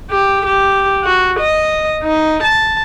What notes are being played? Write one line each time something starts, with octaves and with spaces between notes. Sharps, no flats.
G4
G4
F#4
D#5
D#4
A5